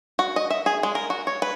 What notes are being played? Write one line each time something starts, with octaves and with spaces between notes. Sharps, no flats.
F#4
D#5
E5
G#4
G#3
A#4
F#4
C#5
B4